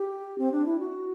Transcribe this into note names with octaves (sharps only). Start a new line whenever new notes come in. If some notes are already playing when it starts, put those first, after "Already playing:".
Already playing: G4
C4
D4
E4
F#4